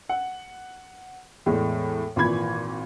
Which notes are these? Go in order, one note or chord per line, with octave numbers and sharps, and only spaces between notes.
F#5
E2 A2 G#3
G#1 A#2 E3 B5 G#6